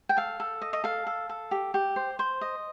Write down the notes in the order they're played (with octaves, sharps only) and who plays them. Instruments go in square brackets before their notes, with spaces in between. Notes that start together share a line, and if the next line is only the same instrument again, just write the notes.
[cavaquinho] G5
A4 F5
A4
D#5
D#5
A4 F5
A4
A4
G4
G4
C5
C5
D#5